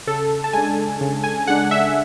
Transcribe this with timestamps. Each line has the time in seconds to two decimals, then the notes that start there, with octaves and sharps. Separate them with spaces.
0.07 C#3 A4
0.44 A5
0.53 G#3 D4 G#5
1.01 C#3
1.24 G#5
1.47 G#3 D4 F#5
1.71 E5